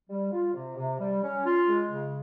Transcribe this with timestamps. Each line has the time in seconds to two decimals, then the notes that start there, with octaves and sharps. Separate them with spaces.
0.10 G3
0.32 F4
0.54 C3
0.78 C3
1.00 G3
1.23 C#4
1.45 F4
1.68 G#3
1.90 C#3